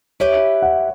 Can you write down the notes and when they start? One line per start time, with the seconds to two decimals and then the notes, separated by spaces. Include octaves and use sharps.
0.20 E4 G4 B4 C#5
0.62 F#5